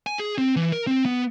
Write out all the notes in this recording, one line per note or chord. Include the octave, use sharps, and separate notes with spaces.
G#5
G#4
C4
E3
A#4
C4
B3